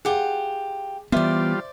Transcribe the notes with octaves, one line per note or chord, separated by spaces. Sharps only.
F4 G4 G#4 F#5
E3 G3 B3 F4 C5 D5 E5